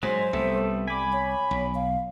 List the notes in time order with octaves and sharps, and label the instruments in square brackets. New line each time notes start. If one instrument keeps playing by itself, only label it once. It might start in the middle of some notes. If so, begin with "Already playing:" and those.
[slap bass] G#2 [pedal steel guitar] F#3 F#4 [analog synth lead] G#3 [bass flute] C5
[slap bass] C2 [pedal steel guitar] G3 B3 E5 [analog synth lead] A3
[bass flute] G3 [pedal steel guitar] G#5 D6 [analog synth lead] B5
[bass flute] C#5
[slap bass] B1
[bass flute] F5